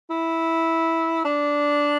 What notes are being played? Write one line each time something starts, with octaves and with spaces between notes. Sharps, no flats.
E4
D4